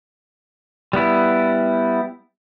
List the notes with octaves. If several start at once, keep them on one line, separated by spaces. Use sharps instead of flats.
G3 B3 E4